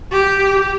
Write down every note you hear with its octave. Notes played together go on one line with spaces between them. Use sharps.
G4